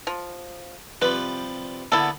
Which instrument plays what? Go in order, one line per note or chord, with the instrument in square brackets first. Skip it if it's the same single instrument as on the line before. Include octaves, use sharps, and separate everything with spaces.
[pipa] F3
[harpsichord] C3 F3 G3 [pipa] B4
[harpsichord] D3 A#3 B3 [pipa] E4 A4